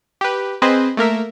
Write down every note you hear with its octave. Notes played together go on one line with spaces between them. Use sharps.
G4 B4
C4 G#4 B4 C5 D#5
A3 A#3 A#4 E5